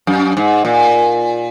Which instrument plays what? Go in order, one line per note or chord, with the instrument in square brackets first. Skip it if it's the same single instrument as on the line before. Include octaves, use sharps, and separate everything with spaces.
[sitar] F#2
G#2
A#2